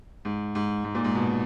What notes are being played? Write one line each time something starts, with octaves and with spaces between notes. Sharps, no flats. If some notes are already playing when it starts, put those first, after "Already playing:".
G#2
G#2
G#2
A#2
G#2
B2